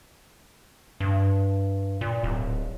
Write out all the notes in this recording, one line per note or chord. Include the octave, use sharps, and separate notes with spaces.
G2
A#2
D1